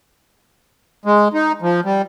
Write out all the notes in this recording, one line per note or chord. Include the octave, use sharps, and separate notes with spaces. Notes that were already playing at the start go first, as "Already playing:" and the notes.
G#3
D#4
F3
G3